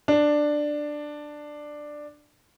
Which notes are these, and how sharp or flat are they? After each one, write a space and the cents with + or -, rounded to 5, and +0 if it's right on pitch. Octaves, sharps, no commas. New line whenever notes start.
D4 +10